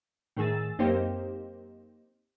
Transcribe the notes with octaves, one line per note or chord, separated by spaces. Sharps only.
A2 D#3 G#4 E6 A6
F#2 A#3 C4 D#4 G4 C5